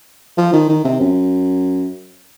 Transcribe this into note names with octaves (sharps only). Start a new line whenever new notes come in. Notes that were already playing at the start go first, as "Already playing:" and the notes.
F3
D#3
D#3
C3
F#2